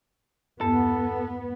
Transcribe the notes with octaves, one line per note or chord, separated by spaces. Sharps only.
E2 G2 B3 A4